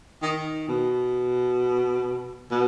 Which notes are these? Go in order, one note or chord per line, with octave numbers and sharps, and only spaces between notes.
D#3
B2
B2